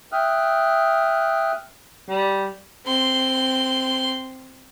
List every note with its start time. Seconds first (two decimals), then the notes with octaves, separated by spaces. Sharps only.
0.12 E5 G5 D#6 F6 F#6
2.09 G3
2.86 C4 C6